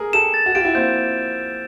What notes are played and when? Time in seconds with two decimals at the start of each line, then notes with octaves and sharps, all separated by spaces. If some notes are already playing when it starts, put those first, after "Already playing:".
Already playing: G#4 A#4
0.13 G4 A4 E7
0.34 A6
0.46 F#4
0.55 F4 G4 D7
0.65 E4 F#4
0.75 A#3 C4 G6